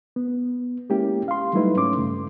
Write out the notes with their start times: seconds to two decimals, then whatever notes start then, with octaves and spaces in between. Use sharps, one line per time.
0.16 B3
0.90 G#3 A#3 C#4 E4 G4
1.28 F5 C6
1.53 F#3 G3 A3 D#4 E4 B4
1.77 G#2 C#4 C6 D6
1.96 G2 C#3 A3